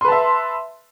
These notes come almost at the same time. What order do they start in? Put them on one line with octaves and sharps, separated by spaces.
C6 B4 A5 E5